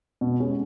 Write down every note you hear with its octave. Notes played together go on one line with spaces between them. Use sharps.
B2
G#3 C#4